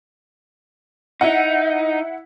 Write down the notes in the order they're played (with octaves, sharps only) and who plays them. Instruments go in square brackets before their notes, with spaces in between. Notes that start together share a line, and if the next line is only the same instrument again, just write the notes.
[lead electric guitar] D#4 [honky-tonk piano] E4 F#5